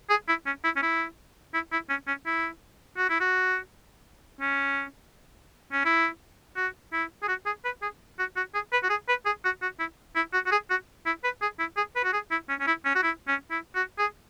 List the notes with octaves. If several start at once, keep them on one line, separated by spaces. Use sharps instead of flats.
G#4
E4
C#4
E4
C#4
E4
E4
E4
C#4
C#4
E4
F#4
E4
F#4
C#4
C#4
E4
F#4
E4
G#4
F#4
G#4
B4
G#4
F#4
F#4
G#4
B4
F#4
G#4
B4
G#4
F#4
F#4
E4
E4
F#4
F#4
G#4
F#4
E4
B4
G#4
E4
G#4
B4
F#4
G#4
E4
C#4
C#4
E4
C#4
F#4
E4
C#4
E4
F#4
G#4